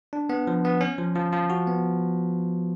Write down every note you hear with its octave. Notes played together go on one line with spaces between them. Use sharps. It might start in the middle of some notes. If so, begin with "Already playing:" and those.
D4
B3
F3
B3
C#4
F3
F3
F3
F#4
B3